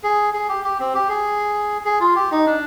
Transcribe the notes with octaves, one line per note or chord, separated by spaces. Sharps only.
G#4
G#4
G4
G4
C4
G4
G#4
G#4
F4
G4
D#4
D4